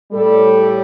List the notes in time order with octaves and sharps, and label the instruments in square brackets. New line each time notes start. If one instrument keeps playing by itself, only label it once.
[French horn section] A2 G3 A4